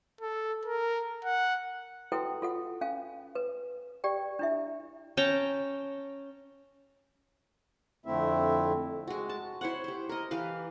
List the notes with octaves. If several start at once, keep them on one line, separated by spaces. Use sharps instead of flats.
A4
A#4
F#5
E4 F#4 A4 B4 F#5 G5
F4 A4 F#5
C#4 F5 G#5
B4
G4 D5 G5
D4 E4 E5
C#4 G5 A5 A#5
F2 D3 A3 C4 E4 E5
G#3 F#4
A5
E4 C5 C#5 F#5
G4 C5
A#4 D#5
E3 G4 B4 F5